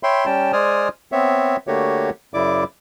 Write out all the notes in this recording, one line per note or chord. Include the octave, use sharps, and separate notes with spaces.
C#5 E5 G5 B5 C6
G3 C#4 G5 A5
G#3 C5 D5 G#5 D#6 F6
B3 C4 C#5 E5
D3 A3 A#3 F#4 G4 C#5
F#2 C#3 E4 D5 D6